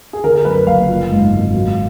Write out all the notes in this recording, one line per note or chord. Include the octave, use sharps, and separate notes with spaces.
G#4
D3 A#4
A#4
F#2 B4
F#1 F5
F3
G#2
G#1
F#3